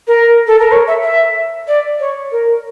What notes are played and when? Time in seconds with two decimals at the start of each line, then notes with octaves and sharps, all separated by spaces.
0.07 A#4
0.47 A4
0.59 A#4
0.72 C#5
0.87 E5
1.03 E5
1.68 D5
2.00 C#5
2.32 A#4